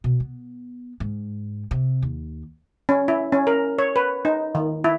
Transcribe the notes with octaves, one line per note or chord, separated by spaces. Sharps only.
B2
B3
G#2
C3
D#2
C#4
E4
C#4
A#4
C#5
B4
D#4
D#3
E4